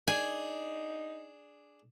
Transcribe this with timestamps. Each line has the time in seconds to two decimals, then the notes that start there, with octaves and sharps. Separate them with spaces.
0.08 D4 D#4 G#4 G#5